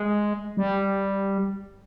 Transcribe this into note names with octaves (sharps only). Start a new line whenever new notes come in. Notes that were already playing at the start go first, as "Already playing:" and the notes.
Already playing: G#3
G3